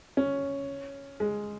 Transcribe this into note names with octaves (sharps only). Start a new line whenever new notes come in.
C#4
G#3